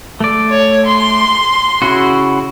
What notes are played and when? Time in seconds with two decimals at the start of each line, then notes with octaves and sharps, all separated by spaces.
0.20 A3 D5
0.49 C#5
0.86 C6
1.82 C#3 E4 F#4